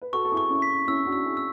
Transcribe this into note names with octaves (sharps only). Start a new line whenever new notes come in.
B4
F#4 A4 C#6
A4
E4 G#4
C#6
C#4 E4
B6
C#4 E4 E6
D4 F#4
E6
E4 G#4
E6